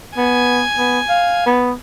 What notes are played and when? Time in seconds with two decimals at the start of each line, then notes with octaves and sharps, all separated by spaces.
0.17 B3 G#5
0.78 B3
1.09 F5
1.46 B3